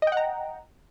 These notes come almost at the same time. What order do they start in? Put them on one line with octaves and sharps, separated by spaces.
D#5 G5 F#5 A#5